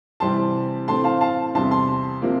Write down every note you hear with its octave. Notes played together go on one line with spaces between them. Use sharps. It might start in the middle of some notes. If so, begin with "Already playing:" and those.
C3 E3 G3 C4 A5 C6
A2 E3 A3 C4 A5 C6
F5 A5
F5 A5
E2 C3 G3 A5 C6
A5 C6
C3 F3 A#3